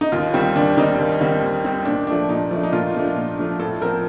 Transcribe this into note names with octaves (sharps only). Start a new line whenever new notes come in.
D#4
D#2 F4
D#3 G3 C4
D#2 D4
D#3 G3 C4 D#4
D#2
D#3 G3 C4
D#2
D#3 G3 C4
A#2 D4
F3 A3 D4
A#2 D#4
F3 A3 D4
D#4
A#2 F4
F3 A3 D4
A#2
F3 A3 D4
A2 A4
F3 C4 A#4